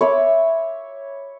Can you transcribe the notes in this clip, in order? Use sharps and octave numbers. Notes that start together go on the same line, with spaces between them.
C#5 E5 B5 D6